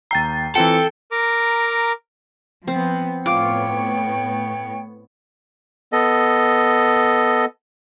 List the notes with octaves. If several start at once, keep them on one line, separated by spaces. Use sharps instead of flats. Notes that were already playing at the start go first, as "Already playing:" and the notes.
D#2 G5 A#5 A6 C7
E3 C4 F4 A4 G5 C#7
A#4 A#5 D6
F3 B3 C4
A2 B3 F4 C#5 G5 D6
B3 A4 D#5